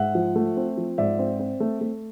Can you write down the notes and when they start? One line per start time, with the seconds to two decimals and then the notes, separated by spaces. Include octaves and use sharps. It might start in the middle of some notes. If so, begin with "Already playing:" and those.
Already playing: G#2 E5 F#5
0.15 F3
0.36 A3
0.57 C4
0.77 F3
0.98 G#2 D5 E5
1.19 C4
1.40 C4
1.60 A3
1.81 A3